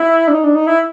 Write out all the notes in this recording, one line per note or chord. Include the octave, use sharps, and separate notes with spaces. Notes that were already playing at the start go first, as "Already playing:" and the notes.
Already playing: E4
D4
D#4
D4
D#4
E4